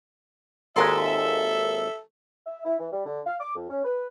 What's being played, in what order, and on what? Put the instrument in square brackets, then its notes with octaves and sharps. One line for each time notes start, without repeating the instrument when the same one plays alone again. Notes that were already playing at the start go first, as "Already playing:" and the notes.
[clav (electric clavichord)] G#1 D#2 G#3 [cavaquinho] F4 A#4 C6 [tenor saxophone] A4 [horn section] E5
[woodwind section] E5
E4
E3
G3
D3
F5
D6
F2
C#4
B4